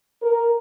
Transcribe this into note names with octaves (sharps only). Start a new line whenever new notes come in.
A#4